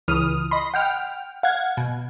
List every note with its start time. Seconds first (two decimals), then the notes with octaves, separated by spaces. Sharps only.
0.08 C#2 E3 D#6 F6
0.51 D#5 B5 C6
0.74 F#5 G5 F6
1.43 F5 F#5 G#6
1.77 B2